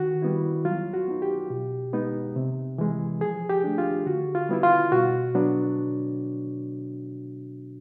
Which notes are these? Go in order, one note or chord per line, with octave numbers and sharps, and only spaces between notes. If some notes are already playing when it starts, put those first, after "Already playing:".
Already playing: D#3 F#4
G3 B3 E4
F#3 F4
F#4
B3 D#4
G4
B2
G#3 B3 D#4
C3
E3 G#3
F3 G#4
G4
A3 D4
F4
D3 F#4
F4
G3 B3 E4
F4
B2 F#4
F#3 B3 D4